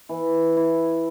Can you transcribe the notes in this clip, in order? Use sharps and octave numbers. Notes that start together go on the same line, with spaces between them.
E3
E4